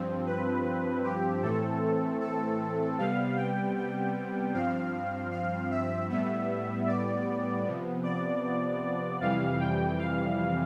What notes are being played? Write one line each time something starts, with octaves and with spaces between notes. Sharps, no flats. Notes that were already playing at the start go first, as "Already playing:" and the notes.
Already playing: G2 F3 C4
B4
G4
A2 E3 A3 C4 A4
A4
C3 G3 B3 F5
G5
G5
G2 F3 C4 F5
F5
E5
A2 G3 B3 E5
D5
C3 F3 B3
D5
F2 C3 E3 G3 F5
G5
F5